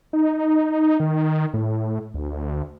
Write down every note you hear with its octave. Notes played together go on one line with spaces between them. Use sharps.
D#4
D#3
A2
D2